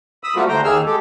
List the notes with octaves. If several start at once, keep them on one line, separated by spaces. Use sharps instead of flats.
B5 D#6 E6
G3 A3 A#3 C4 F4 F#4
D#2 D3 A3 C5 G5 A#5
D#2 D#3 A#3 G#4 E6 F6
G#3 G4 A4